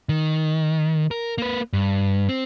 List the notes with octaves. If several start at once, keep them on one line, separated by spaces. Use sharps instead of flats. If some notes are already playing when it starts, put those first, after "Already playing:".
D#3
A#4
A#3 B4
G2
C4